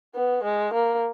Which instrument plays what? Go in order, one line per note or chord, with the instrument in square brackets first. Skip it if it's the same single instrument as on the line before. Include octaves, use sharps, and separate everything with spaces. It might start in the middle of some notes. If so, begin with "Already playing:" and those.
[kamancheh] B3
G#3
A#3